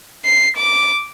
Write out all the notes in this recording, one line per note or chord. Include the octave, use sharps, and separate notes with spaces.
C7
D6